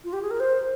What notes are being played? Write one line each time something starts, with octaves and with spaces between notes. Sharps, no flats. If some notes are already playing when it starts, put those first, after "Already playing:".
F4
G4
G#4
A#4
C5